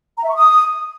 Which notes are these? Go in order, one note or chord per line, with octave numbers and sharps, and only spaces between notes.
A#5
E5
C#6
D#6